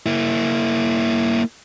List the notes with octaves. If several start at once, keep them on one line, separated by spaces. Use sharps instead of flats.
A#3 E4